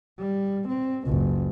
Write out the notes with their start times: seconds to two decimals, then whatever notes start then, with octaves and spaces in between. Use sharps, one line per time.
0.19 G3
0.68 C4
1.06 F#1 C#2